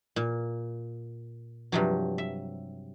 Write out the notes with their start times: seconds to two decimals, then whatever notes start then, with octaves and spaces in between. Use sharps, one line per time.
0.16 A#2
1.72 G2 C3 F3 F#3
2.18 E5